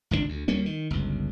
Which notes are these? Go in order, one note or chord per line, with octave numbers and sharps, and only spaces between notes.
G#1 C#2 D3 D4
D2
D2 G3 A#3 C#4
D#3
G1 C#2